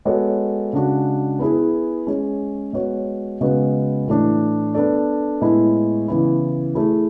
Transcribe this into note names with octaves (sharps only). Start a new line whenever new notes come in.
G#3 B3 F#4 A4 C#5
C#3 G#3 D4 F#4
B3 E4 G#4 B4
G#3 C#4 G#4
G#3 B3 F#4 C#5
C#3 G#3 B3 F#4 B4
A2 E3 A3 D4
B3 D4 A4 D5
A2 G#3 B3 E4
C#3 E3 B3 E4
A3 E4 G#4